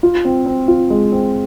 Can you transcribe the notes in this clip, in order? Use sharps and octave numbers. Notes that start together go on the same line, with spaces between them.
F4
C4
C4
F4
G#3
C4